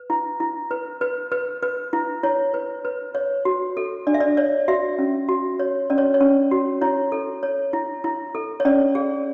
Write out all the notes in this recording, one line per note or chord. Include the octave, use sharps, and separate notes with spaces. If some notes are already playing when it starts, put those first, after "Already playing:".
Already playing: B4
E4
E4
B4
B4
B4
B4
E4
E4 C#5
B4
B4
C#5
F#4
A4
D4 D5
E5
D5
C#5 D5
F#4 E5
C#4
F#4
C#5
C#4 D5
C#5
C#5
C#4
F#4
E4 C#5
A4
C#5
E4
E4
A4
C#5
C#4 D5
G#4